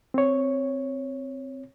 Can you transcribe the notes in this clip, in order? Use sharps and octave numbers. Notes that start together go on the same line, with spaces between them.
C4 C#5